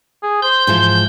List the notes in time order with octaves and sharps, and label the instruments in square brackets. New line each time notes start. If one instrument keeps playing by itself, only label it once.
[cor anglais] G#4
[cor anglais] C5 [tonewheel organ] G6
[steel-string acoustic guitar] G#2 E3 F3